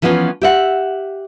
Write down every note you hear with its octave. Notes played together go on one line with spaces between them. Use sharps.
E3 F3 B3 C#4 D#4 F4
G4 E5 F#5